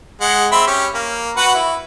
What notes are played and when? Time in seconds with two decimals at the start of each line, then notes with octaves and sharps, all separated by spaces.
0.21 G#3 F#5
0.52 C4 E5 B5
0.67 C#4 G4
0.94 A#3
1.37 F#4 B4 F#5
1.54 E4